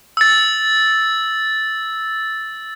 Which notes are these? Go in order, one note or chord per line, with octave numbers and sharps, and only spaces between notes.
E6 A6